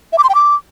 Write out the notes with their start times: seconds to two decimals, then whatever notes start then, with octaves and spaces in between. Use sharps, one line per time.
0.13 E5
0.18 D6
0.24 C6
0.29 G5
0.35 D6